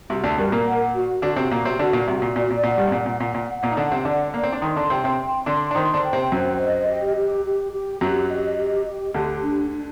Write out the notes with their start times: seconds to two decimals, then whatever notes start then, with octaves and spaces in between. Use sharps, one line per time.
0.10 C2 C3 F#4
0.24 D2 D3
0.38 G2 G3 A#4
0.52 A#2 A#3
0.67 F#5
0.94 F#4
1.22 D3 D4 F#4
1.36 C3 C4
1.51 A#2 A#3 F#4
1.65 C3 C4
1.79 D3 D4 F#4
1.93 A#2 A#3
2.07 C2 C3 F#4
2.22 A#2
2.36 A#2 D5
2.50 A#2
2.63 A#2 F#5
2.78 G2 G3
2.87 C3
2.92 A#2 F#5
3.06 A#2
3.20 A#2 F#5
3.34 A#2
3.49 F#5
3.63 A#2 A#3
3.72 D#4
3.77 D3 D4 F#5
3.92 C3 C4
4.05 D3 D4 D5
4.34 A#3 D5
4.43 C4
4.53 D4
4.61 D#3 D#4 C6
4.76 D3 D4
4.90 C3 C4 G5
5.04 C3 C4
5.18 C6
5.46 D3 D4 C6
5.71 D4
5.75 D#3 D#4 C5
5.94 D3 D4
6.03 G5
6.13 C3 C4
6.32 F#2 F#3 C5
6.59 D#5
6.88 G4
7.17 G4
7.45 G4
7.73 G4
8.01 F#2 F#3 G4
8.30 D#5
8.57 G4
8.86 G4
9.14 D2 D3 G4
9.42 D4
9.71 D4